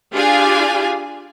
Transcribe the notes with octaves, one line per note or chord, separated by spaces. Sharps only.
D4 F4 G4 G#4 F5 G#5